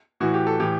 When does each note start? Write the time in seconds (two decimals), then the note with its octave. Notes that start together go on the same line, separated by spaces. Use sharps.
0.20 A2 E3 F#4
0.34 G4
0.47 A4
0.60 A2 E3 G4